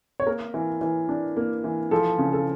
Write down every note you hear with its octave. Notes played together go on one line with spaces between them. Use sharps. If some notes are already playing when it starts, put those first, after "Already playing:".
C#5
A#3 A#4
E3
E3
D4
A#3
E3
F3 A4
C#3
A4